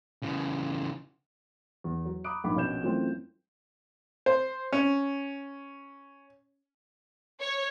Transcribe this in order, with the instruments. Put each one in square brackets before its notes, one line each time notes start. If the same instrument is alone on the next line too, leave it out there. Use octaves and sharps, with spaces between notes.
[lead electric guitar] C#3 E3
[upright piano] E2
F#3
A#5 B5 D6 D#6 F#6 D7
A#1 G#2 B5 D6
A#1 B2 C#4 G6 E7
F#2 E3 A3 C4 F4
[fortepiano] C5
C#4
[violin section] C#5